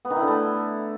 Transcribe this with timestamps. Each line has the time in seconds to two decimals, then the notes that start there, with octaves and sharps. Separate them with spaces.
0.05 B3
0.10 D#3
0.16 E4
0.22 D3
0.28 A3